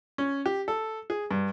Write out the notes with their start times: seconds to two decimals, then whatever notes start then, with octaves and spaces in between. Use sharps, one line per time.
0.18 C#4
0.46 G4
0.68 A4
1.10 G#4
1.31 G2